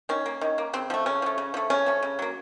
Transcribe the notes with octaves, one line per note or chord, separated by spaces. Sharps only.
D#3 C#4
A#3
D#3
A#3
C#3 C4
F3 A3
C#3 C#4
F3 A3
C#3
F3 A3
C#3 C#4
F3 A3
C#3
F#3 A#3